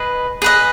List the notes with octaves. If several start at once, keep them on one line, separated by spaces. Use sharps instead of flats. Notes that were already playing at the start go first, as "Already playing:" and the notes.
Already playing: G#4 B4 D#5
G#4 B4 D#5